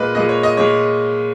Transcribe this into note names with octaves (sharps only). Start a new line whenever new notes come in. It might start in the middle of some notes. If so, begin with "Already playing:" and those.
Already playing: A#2 G#3 B4 D#5
A#2 G#3 D#5
C#5
D#5
A#2 G#3 C#5